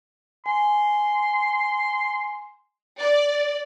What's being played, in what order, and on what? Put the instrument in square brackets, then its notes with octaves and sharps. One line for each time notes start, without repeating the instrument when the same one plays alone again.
[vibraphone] G#5 [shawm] C6
[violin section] D5